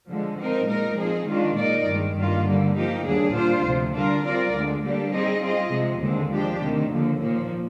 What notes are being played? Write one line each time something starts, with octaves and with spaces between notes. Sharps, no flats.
D3 F3 G#3
F3 C4 D#4 A#4
A#2 G#3 D#4 A#4
F3 C4 D#4 G#4
D#3 G#3 D4 F4
A#2 G#3 D#4 A#4 D5
G2 D#3 G#3
G2 D#3 A#3 F4
D3 G3 A#3
F3 A#3 D#4 G4
D#2 D3 G3 D4 G#4
A#2 G3 D4 F4 C5
D2 C3 F3
D3 G3 D4 F4 A#4
G3 C4 F4 A#4 D5
D2 D3 G#3
D3 G3 A#3 D4 G4
G3 C4 D#4 G#4 D#5
G3 C4 F4 G#4 D#5
C3 F3 G#3
D#2 D3 G#3 C4
F3 G#3 D4 G4
D2 C3 D#3
D#2 D3 F3 A#3
A#2 F3 A#3